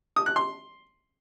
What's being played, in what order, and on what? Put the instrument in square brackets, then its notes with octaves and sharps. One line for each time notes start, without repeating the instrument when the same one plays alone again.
[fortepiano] D#6
F#6
C6